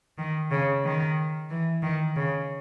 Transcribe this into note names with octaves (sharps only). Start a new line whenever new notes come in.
D#3
C#3
D#3
E3
D#3
C#3